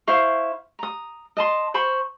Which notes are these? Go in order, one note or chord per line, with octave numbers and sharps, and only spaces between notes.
E4 C5 F5 C#6
A#5 D#6
D#5 A5 C6
C5 B5 C#6